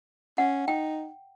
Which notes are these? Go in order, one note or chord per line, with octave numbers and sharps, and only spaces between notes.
C#4 F#5
D#4 G5